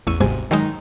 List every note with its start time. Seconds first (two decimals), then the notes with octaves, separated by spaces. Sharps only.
0.07 A1 E2 C#6 E6 D#7
0.20 G1 D2 G#2 C3 G#5
0.51 D#3 F#3 G#3 D#4